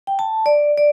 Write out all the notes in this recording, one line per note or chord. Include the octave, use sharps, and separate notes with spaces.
G5
A5
D5
D5